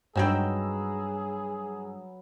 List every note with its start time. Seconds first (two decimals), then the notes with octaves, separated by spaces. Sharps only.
0.16 G2 D#3 F#3 G#3 C4 G#4 B4 E6